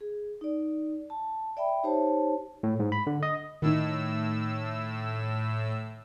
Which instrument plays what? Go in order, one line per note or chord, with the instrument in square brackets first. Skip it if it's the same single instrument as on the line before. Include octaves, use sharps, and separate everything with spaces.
[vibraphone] G#4
D#4 D5
A5
D5 E5 G5 B5
D#4 G4 C5 C#5 A5
[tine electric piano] A2
G#2
B5
D3
D#5
[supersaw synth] A2 E6 [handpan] D#3 D#4